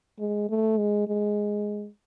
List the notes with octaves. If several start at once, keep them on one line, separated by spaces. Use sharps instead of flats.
G#3
A3
G#3
G#3